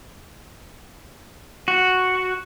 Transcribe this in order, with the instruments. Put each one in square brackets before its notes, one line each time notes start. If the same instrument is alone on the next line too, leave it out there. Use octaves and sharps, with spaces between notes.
[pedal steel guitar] F#4